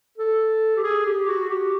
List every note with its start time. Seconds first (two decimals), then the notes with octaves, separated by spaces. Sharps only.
0.18 A4
0.76 G4
0.84 G#4
1.06 G4
1.28 F#4
1.50 G4